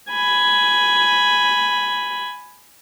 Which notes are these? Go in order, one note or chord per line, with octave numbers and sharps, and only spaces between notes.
G#5 B5